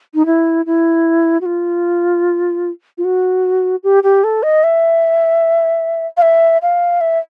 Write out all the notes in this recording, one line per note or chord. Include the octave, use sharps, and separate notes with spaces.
D#4
E4
E4
F#4
F4
F4
F#4
G4
G4
A4
D#5
E5
F5
E5
F5
E5